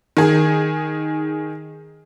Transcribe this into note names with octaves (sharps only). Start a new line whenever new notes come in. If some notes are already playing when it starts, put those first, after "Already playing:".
D#3 G#4